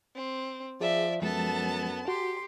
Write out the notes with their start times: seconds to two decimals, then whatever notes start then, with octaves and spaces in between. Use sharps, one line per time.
0.15 C4
0.81 F3 G#4 D5 E5
1.22 F#2 F3 G#3 B3 A4 A5
2.08 F#4 G4 C6